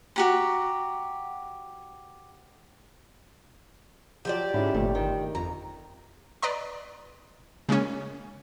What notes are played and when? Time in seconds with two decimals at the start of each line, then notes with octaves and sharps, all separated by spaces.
0.16 F#4 G4 A#5
4.25 F3 F#3 G4 C5 D5
4.54 G#2 D3 C#4 E4
4.74 G1 F2 A#2 A3
4.95 D#3
5.35 F2 A#5
6.42 B4 D5 D#5 A#5 C6
7.69 C#3 G#3 A#3 C#4